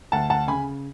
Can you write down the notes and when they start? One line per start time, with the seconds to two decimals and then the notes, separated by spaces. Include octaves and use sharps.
0.12 D2 F#5 A5
0.30 F#5 A5
0.48 C#3 G#5 B5